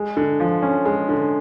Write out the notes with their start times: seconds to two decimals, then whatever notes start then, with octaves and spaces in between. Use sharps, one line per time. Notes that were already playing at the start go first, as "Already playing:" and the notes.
Already playing: G#3
0.17 D3
0.40 F3
0.62 C#4
0.85 G#3
1.09 D3